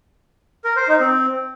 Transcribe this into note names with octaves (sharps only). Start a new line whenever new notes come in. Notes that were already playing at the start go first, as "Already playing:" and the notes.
A#4
C5
D#4
C4